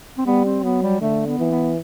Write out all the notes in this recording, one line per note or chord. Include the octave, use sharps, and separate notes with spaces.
C4
G3 B3
C4
F#3 B3
G3
D3 A3
B3
E3
B3